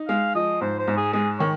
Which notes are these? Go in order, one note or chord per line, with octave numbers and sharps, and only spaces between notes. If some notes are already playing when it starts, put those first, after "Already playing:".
Already playing: D#4
G#3 F5
F3 D#5
G#2 C5
C5
G#2
G#4
G#3 G#4
D#3 C#5